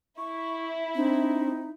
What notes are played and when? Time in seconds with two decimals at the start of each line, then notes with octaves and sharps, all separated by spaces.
0.18 E4 C#6
0.95 C4 D4 D#4